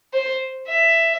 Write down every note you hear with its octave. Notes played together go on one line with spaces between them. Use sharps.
C5
E5